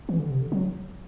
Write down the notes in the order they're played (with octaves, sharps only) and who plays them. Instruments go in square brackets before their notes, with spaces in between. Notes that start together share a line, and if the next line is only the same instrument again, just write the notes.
[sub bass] E3
D3
C3
D3
F#3